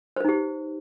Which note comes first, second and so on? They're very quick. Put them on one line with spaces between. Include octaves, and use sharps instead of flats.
C5 B4 D#4 G4